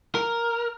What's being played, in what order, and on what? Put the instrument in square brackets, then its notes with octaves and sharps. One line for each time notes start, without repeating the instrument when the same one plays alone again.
[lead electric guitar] A#4